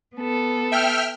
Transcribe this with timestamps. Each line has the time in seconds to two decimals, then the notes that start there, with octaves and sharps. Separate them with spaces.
0.17 B3 A4
0.72 E5 G5 F6